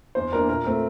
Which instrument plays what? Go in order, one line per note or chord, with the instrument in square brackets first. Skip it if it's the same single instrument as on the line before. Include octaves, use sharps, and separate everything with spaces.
[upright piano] E2 C5
E3 A#3 D4 A#4
A#2 A#4
A3 C4